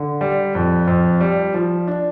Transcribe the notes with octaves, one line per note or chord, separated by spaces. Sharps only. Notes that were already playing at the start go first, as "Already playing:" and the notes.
Already playing: D3
G3
F2
F2
G3
F3
D4